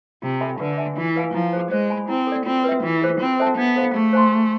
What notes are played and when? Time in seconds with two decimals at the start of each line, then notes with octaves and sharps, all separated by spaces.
0.22 C3 F4
0.41 A4 E5 G#5 B5
0.60 D3 B4
0.78 E5 G#5
0.97 E3 F4
1.16 B4 F5 G#5
1.34 F3 E4
1.53 G#4 C5
1.71 G#3 C5
1.90 G#5 B5
2.08 C4 E4
2.27 A4 D5
2.46 C4 F4
2.64 B4 E5
2.83 E3 F4
3.02 G#4 C5
3.20 C4 F4
3.39 A4 C5 E5 A5
3.57 B3 D4
3.76 A4 C5 F5 B5
3.95 A3 G#4
4.13 C5 G#5 C6
4.32 G#4